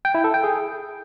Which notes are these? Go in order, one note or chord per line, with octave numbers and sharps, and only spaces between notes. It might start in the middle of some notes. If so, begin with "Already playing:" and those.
G5
E4
A4
G5
G#4